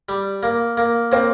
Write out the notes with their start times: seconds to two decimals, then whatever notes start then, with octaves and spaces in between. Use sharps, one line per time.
0.09 G3
0.43 A#3
0.77 A#3
1.12 A#3 C4